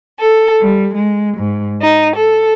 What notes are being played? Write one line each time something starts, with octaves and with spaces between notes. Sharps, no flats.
A4
G3
G#3
G#2
D#4
A4